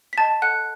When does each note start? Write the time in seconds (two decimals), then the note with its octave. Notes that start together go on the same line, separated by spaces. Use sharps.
0.13 B6
0.17 D#5 F#5 A5 A6
0.42 A4 F#5 F#6